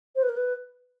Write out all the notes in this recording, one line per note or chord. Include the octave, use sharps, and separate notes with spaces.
C5
B4
A#4
B4